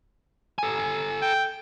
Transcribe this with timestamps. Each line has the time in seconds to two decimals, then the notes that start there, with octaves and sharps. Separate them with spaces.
0.59 A4 G#5
1.22 G5